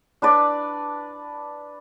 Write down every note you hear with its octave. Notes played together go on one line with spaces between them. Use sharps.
D4 B4 D5